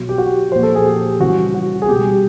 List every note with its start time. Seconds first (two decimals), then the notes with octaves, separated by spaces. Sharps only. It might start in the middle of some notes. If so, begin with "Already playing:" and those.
Already playing: B2 F#3
0.09 G4
0.18 F#4
0.52 A#2 F3 C5
0.63 A4
0.75 G#4
0.86 G4
1.20 C#3 E3 G3 F#4
1.55 F#4
1.82 G#4
1.88 B2 G3 G4